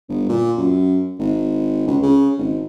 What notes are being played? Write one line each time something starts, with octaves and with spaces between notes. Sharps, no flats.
G1
A#2
F#2
G#1
C#2
C#3
G#1